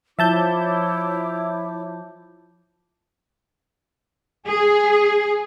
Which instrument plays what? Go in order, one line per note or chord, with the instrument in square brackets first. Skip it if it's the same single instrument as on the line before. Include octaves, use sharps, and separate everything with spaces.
[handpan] F3 [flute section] E4 C#5 D6 [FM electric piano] E5 A5 G6
[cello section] G#4